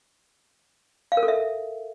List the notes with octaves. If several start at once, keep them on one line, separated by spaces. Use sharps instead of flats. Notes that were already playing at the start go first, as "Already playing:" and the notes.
F5
A#4
A4
E5